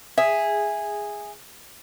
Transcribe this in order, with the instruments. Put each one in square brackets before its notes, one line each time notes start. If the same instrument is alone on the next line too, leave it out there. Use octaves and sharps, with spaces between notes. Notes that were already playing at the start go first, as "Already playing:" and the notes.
[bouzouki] G#4 [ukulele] E5